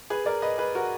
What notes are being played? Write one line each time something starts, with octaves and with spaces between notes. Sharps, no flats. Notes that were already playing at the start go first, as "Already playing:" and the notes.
G#4 B4
A#4 D5
B4 D#5
G#4 B4
F#4 A#4